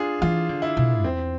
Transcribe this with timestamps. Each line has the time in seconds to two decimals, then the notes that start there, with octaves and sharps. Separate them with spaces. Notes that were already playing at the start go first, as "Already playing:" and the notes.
Already playing: D4 F4 G#4
0.22 E3 F4
0.49 D3
0.62 E4
0.77 B2
1.04 E2 C4